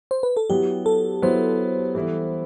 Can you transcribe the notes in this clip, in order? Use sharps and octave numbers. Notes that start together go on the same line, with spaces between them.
C5
B4
A4
F#3 B3 E4 G4
A4
F#3 B3 E4 C5
E3 G3 B3 E4